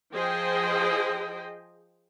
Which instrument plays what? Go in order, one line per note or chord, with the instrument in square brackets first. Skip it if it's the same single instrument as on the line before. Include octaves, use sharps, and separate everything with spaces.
[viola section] F3 G#4 C5 D#5 G5